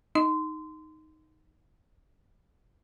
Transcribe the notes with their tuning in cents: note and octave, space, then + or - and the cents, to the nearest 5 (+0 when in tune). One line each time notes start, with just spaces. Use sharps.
D#4 +0 C6 -25